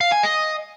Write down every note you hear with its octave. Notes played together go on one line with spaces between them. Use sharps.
F5
G#5
D#5